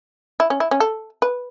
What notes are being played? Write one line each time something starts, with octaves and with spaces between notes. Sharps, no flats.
E4
C#4
E4
C#4
A4
B4